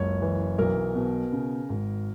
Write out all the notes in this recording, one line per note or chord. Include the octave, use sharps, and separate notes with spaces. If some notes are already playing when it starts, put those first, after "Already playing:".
Already playing: F#1 C#2 C#5
E3
B1 A#4
B2
C#3
G#1